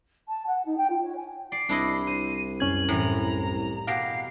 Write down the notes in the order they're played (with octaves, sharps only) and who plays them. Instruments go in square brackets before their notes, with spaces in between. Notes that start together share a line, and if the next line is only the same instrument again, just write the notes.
[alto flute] A5
F#5
D#4
G5
F4
C#5
G#5
[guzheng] D5 [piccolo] C7
[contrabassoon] C2 [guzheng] D4 E4 D#5
[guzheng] C5 [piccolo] D#7
[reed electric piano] F#2 C#4 G#6 [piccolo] F#7
[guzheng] A2 E3 [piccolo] A#5
[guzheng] B2 G4 A#4 [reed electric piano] F5 F#5 [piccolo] C7